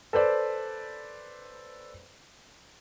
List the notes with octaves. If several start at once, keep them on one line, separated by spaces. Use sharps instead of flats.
A4 B4 C5 D5